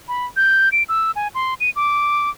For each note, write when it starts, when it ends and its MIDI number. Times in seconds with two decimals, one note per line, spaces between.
0.08 0.26 83
0.36 0.69 91
0.72 0.83 98
0.89 1.11 88
1.16 1.28 80
1.35 1.54 84
1.60 1.70 99
1.76 2.30 86